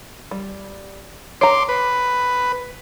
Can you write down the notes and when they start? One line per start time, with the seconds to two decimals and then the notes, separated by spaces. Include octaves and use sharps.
0.31 G3
1.41 C#5 A#5 C6 D6
1.69 B4